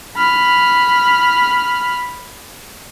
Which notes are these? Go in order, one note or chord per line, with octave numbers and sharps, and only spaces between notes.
B5 F6